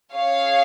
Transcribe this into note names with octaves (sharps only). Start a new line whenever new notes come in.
C#4 G#4 C#5 F5